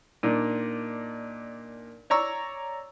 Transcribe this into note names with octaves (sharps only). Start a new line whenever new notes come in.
A#2 D4 D#4
C#5 D5 A#5 C#6 E6